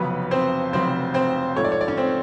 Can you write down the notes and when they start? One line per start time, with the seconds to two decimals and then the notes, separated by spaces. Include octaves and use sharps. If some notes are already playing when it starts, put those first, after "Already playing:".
Already playing: F1 F2 C#3 F#3 B3 B4
0.31 C4 C5
0.72 F1 F2 C#3 F#3 C4 C5
1.14 C4 C5
1.56 G#2 F3 A3 C#5
1.64 D5
1.72 C#5
1.81 D5
1.88 C#4 C#5
1.97 C4 C5